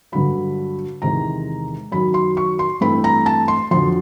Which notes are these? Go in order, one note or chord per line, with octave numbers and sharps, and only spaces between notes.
G2 D3 F#3 B5
E2 C3 D#3 G#3 A#5
F#2 D#3 F#3 B5
C6
C#6
C6
G2 E3 A3 C4 E4 B5
A#5
A5
C6
F2 D3 F#3 C6